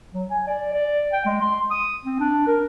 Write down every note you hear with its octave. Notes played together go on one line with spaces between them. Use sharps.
F#3
G#5
D5
D5
G5
G#3
C6
D#6
C4
D4
A#4